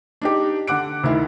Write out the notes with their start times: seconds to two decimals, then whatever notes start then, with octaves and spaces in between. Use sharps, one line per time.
0.22 D4 D#4 G4
0.67 D3 F#5 D6 F#6 D7
1.03 D2 D#3 E4